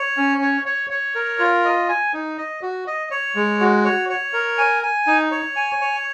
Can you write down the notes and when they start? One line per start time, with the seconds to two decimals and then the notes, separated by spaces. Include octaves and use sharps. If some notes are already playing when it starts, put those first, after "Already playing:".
Already playing: C#5
0.17 C#4
0.42 C#5
0.66 C#5
0.90 C#5
1.15 A#4
1.39 F4
1.64 D#5
1.89 G#5
2.14 D#4
2.38 D#5
2.62 F#4
2.87 D#5
3.11 C#5
3.35 G#3
3.60 F#4
3.84 C#5
4.09 C#5
4.33 A#4
4.58 G#5
4.83 G#5
5.07 D#4
5.31 C#5
5.56 G#5
5.81 C#5